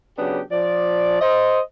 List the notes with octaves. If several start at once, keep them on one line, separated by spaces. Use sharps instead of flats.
C#3 F#3 B3 D4 G4
F3 D5
C5 D#5